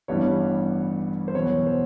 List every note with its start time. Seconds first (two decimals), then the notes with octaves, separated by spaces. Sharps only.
0.08 A1 G2 E3 G3 B3 C#5
1.28 C5
1.34 E2 B2 F#3 C#5
1.67 C5